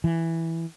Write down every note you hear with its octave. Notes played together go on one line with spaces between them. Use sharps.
E3